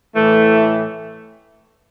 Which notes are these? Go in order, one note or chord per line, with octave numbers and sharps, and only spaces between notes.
A2 E3 A3